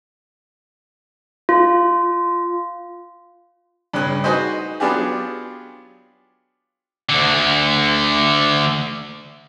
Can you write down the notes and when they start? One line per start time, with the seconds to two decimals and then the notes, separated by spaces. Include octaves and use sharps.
1.49 F4
3.93 G2 C#3 C#4 F#6
4.24 D#4 F#4 G#4 B4 C5 D#5
4.80 F#3 B3 D4 F4 G4 G#4
7.09 D2 D3